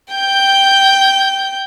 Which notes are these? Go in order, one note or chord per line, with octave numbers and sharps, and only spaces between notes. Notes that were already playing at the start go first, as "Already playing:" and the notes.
G5 G6